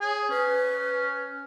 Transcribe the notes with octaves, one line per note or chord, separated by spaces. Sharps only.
G#4 C#5
C#4 B4